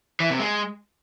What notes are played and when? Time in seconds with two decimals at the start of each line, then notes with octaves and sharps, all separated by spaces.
0.20 E3
0.30 C3
0.39 G#3